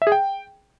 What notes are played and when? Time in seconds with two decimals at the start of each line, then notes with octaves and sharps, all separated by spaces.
0.02 E5
0.07 G#4
0.12 G5